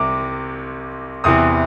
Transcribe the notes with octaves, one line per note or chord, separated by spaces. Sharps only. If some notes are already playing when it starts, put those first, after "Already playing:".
Already playing: C2 C3 D6
E2 C3 E3 D#6